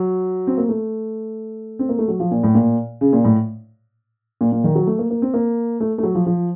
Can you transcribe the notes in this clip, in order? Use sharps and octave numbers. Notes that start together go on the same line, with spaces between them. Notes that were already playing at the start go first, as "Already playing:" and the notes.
Already playing: F#3
C4
A#3
A3
C4
A#3
A3
F#3
F3
A#2
A2
A#2
C#3
A#2
A2
A#2
A#2
D#3
F#3
A3
A#3
A#3
C4
A#3
A3
A3
F#3
F3
F3